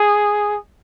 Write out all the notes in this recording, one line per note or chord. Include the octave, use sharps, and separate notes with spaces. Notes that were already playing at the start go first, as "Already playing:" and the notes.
Already playing: G#4